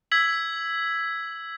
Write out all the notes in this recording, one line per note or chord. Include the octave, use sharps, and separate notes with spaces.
E6 G#6 B6 F#7